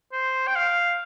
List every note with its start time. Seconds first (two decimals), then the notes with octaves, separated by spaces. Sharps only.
0.12 C5
0.47 G5
0.56 F5